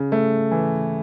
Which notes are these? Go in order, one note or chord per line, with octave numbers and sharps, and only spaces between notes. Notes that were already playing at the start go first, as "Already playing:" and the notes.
Already playing: C#3
A3
E3